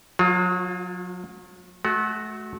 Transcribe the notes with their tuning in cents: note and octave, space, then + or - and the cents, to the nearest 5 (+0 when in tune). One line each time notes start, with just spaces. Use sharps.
F#3 -35 F4 +15
A3 -30 F#4 +0